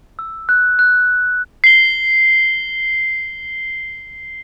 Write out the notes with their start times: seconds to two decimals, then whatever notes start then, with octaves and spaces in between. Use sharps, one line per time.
0.19 E6
0.49 F#6
0.79 F#6
1.64 C7 G7